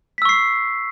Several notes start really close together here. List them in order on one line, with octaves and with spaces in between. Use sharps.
B6 E6 C#6 C7